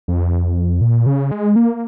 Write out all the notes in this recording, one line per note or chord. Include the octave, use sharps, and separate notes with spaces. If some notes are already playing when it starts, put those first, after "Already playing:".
F2
A#2
C#3
G#3
A#3